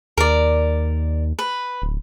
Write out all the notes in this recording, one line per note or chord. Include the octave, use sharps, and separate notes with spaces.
D#2 A#4 D5
B4
D1